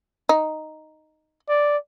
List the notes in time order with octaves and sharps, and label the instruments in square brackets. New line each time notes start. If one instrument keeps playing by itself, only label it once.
[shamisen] D#4
[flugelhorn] D5